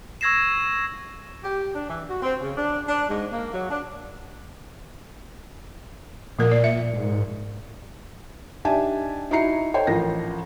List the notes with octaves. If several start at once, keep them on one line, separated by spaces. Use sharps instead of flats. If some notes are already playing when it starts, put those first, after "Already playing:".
C#6 E6 G#6 A#6 C7 E7
G4
D4
E3
F#4
C4
C#3
D4
D4
G#2
A#3
F#3
D4
A#2 F3 A3 A#4
D5
E5
G#2
D4 D#4 G4 E5 G#5 A5
D#4 E4 F#4 A#5 C7 C#7
A4 C5 C#5 D#5 G5
A1 F3 A#4 A#6